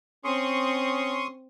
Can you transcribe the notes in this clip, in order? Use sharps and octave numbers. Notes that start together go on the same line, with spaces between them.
C4 C#4 C6 C#6 D#6